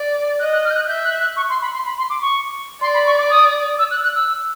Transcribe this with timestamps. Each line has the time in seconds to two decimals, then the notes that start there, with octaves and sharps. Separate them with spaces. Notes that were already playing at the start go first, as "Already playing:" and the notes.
Already playing: D5
0.40 D#5 F#6
0.53 F#6
0.65 F6
0.70 G6
0.76 F#6
0.88 E5 G6
1.04 F#6
1.21 F#6
1.36 C#6
1.49 C6
1.62 B5
1.73 C6
1.85 B5
1.98 C6
2.10 D6
2.22 C#6
2.81 D5 C6
2.94 B5
3.06 C#6
3.18 D6
3.30 D#6
3.79 E6
3.91 F#6
4.03 F#6
4.15 E6